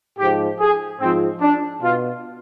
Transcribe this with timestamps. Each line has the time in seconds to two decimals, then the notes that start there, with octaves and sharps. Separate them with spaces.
0.19 G#2 F3 G4
0.59 G#4
1.00 G#2 F3 C4
1.41 D4
1.82 B2 F4